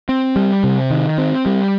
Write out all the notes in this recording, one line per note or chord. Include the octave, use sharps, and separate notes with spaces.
C4
G3
C3
D#3
C4
G3